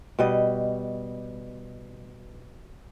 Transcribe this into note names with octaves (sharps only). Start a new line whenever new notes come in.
B2 G3 D#5